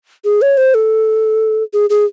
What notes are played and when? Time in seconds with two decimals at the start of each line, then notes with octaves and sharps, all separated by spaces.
0.25 G#4
0.42 C#5
0.57 C5
0.74 A4
1.73 G#4
1.90 G#4